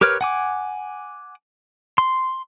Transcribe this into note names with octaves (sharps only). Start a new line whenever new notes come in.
G4 A#4 B4 C#5 F6
F#5 G#5 D6
C6